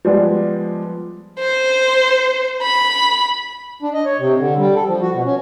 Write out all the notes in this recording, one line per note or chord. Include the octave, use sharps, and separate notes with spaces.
F3 G3 G#3 B3
C5
B5
D4
D#5
C#5
C3
D3
G3
A4
F3
F#4
B2
C#4